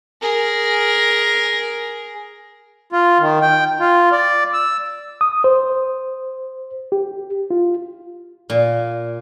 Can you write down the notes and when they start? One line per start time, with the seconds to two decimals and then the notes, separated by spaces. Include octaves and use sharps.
0.22 G#4 A#4
2.92 F4
3.20 D#3
3.42 G5
3.80 F4
4.12 D5
4.54 E6
5.21 D#6
5.44 C5
6.92 G4
7.51 F4
8.50 A#2